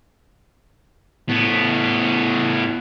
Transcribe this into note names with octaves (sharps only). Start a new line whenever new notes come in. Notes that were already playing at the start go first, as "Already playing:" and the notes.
A2 B3